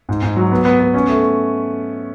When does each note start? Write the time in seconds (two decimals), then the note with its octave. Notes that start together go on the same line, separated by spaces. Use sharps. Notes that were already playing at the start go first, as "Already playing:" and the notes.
0.09 G#2
0.22 G#2
0.36 F#3
0.52 B3
0.65 B3
0.80 B3
0.94 C#4
1.09 A3